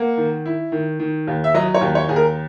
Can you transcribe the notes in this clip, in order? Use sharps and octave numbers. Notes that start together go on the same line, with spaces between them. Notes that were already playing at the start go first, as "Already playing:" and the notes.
Already playing: A#3 F#5
D#3
E4
D#3
D#3
D#2
E5
F#3 D#5
C#5
D#2
C#5
D#2 G#4
A#4